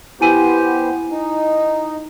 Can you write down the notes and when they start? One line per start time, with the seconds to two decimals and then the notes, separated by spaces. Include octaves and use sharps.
0.21 B3 E4 G4 C5 G#5 D#7
1.11 D#4